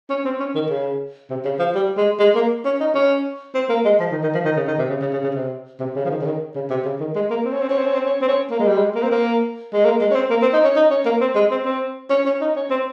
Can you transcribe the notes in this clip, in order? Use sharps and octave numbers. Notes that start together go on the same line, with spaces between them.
C#4
C4
C#4
D#3
C#3
C3
C#3
F3
G3
G#3
G#3
A#3
C#4
D#4
C#4
C4
A#3
G#3
F3
D#3
D#3
F3
D#3
C#3
D#3
C3
C#3
C#3
C#3
C#3
C3
C3
C#3
F3
D#3
C#3
D#3
C#3
C3
C#3
D#3
G#3
A#3
C4
C#4
C4
C#4
C4
C#4
C4
C#4
C4
C#4
A#3
G#3
G3
G#3
A#3
C4
A#3
G#3
A#3
G#3
C#4
C4
A#3
C4
D#4
C#4
D#4
C#4
A#3
C4
G#3
C4
C4
C#4
C#4
D#4
C#4
C4